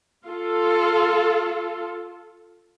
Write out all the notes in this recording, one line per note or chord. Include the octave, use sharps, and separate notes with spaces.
F4 A4